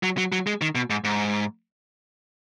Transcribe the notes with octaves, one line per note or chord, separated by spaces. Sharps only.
F#3
F#3
F#3
G#3
D#3
B2
G#2
G#2